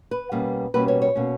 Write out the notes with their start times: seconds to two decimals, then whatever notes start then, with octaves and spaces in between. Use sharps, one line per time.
0.11 B4
0.32 B2 G3 A#3 C#4
0.74 B2 G3 A#3 C#4 B4
0.88 C#5
1.02 C#5
1.15 B2 A#3 C#4